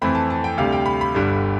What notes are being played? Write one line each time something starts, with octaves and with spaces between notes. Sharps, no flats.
F2 E3 A3 C4 B5
A5
A5
G5
D2 C3 G3 F5
G5
B5
B5
G1 G2 D3 G3